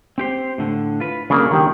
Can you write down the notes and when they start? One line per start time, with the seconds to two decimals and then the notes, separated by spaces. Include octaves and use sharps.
0.18 C4 G4 C5
0.58 A2 D3
1.00 F4 B4
1.30 C#3 F#3 G3 A#3 D4
1.51 D#3 G4 G5